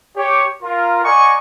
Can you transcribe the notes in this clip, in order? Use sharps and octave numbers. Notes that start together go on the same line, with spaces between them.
G4 C#5
F4 A#4
D5 D#5 F#5 G#5 A#5 C#6